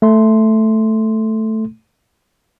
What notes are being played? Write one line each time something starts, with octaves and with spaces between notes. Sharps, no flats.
A3 C6